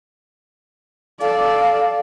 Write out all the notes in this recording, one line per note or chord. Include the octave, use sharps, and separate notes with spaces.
A4 D5 F5